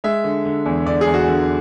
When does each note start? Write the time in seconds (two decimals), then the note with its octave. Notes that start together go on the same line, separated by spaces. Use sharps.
0.04 G#3 E5
0.24 D3
0.45 D3
0.66 E2
0.86 D3 D5
1.01 G#4
1.07 E2
1.14 F#4
1.28 D3